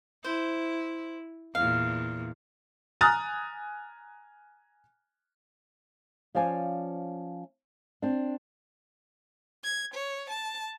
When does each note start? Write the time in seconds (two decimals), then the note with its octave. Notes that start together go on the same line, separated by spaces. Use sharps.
0.24 E4 C5
1.55 E2 A#2 F5
3.01 G#5 A#5 D#6 F6 F#6 A6
6.35 F3 C#4 C5 D5 F5 G#5
8.02 C4 D4
9.64 G#6
9.94 C#5
10.30 A5